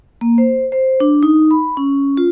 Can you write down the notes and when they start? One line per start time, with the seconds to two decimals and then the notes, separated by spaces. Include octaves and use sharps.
0.21 A#3
0.38 C5
0.72 C5
1.00 D4
1.23 D#4
1.51 B5
1.77 C#4
2.17 F4